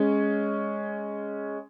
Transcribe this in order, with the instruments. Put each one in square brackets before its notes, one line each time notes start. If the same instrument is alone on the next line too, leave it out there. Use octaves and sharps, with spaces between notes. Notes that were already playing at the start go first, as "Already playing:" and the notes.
Already playing: [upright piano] G#3 C#4